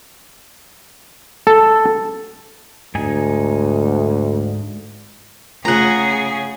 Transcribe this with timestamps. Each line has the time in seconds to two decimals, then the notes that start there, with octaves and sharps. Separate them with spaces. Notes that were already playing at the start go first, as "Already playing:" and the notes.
1.47 A4
2.95 D2 G#2 D#4 G#5
5.65 C#3 A3 F4 G#4 F#5 A#5